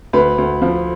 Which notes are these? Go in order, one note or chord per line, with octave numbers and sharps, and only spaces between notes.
D2 B4
D2
F3